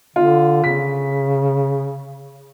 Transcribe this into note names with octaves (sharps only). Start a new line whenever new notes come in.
D3 F4
C#3 B6